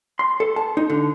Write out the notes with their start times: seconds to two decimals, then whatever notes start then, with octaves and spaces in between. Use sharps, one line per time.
0.19 C6
0.40 A4
0.56 A5
0.77 D#4
0.90 D3